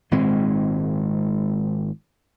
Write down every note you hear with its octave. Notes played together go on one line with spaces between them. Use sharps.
G#1 A#2 G#3 C4